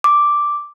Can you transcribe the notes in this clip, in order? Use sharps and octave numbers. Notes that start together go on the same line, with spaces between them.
D6